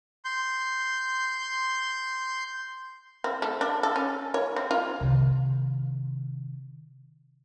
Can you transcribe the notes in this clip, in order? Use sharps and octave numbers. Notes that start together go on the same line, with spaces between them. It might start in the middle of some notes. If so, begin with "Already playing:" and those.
C6 G6
C4
A3
D4
A4
C#4
C#5
C4
F4
C3 D#3